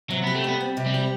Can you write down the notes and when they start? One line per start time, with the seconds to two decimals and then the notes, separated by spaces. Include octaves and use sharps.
0.10 C3 F#3
0.23 B3 G4
0.35 A3
0.44 G3 B3
0.61 C4
0.77 C3
0.86 G3
0.94 G4